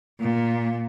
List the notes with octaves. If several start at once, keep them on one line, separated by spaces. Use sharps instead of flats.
A#2